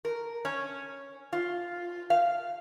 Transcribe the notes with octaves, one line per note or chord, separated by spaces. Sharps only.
A#4
C#4
F4
F5